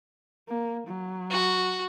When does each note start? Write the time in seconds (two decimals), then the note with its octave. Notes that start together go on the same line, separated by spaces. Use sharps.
0.49 A#3
0.88 F#3
1.30 F#4